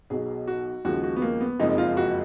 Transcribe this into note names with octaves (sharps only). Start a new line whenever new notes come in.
B1 B2 F#3 G#4
F#4
D#2 C#3 F3 G#3 F#4
F#4
B3
A#3
B3
F#1 F2 F3 G#3 D#4
F4
F#4